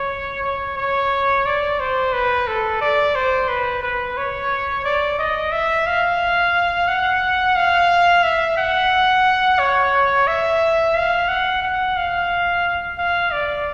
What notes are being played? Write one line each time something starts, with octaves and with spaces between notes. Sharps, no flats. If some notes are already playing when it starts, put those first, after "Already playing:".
Already playing: C#5
C#5
C#5
D5
C5
B4
A4
D5
C5
B4
B4
C#5
D5
D#5
E5
F5
F#5
F5
E5
F#5
C#5
E5
F5
F#5
F#5
F5
F5
D5